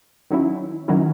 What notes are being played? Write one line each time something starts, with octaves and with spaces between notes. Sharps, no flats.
D#3 F#3 C#4 E4
D#3 F#3 C#4 E4